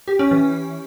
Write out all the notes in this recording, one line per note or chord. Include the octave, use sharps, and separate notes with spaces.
G4
C#4
E3